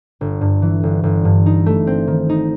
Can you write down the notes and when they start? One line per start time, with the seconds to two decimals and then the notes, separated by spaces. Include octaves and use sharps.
0.21 G1
0.41 G2
0.62 E3
0.83 G1
1.03 G1
1.25 G2
1.46 D#4
1.66 A3
1.87 C4
2.07 D#3
2.29 D#4